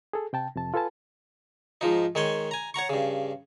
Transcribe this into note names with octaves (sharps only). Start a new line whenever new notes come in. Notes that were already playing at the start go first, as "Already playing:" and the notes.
G#4 A4
C3 G5 A5
F2 C3 A5
F4 A4 B4 G#5 A5
G#2 F3 D#4
D#3 G#3 C#5 G5 G#5
G#5 A#5
C#5 F#5 A#5 C#6
G2 C#3